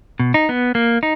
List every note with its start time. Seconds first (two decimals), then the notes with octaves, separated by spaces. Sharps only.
0.20 B2
0.34 D#4
0.49 B3
0.75 A#3
1.03 D#4